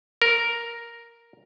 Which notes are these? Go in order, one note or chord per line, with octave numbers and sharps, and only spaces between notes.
A#4